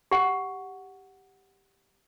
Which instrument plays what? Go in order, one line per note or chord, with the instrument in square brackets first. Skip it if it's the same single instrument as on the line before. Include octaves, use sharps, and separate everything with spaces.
[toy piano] G4 F#5